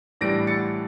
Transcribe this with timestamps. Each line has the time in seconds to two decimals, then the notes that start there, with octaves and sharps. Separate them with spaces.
0.21 A2 E3 G3 D4 A#6 D7
0.47 A6 C#7